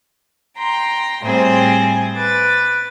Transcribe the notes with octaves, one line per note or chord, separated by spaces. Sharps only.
G5 A#5 C6
A2 G3 C4 G#4 C5
B4 D6 A6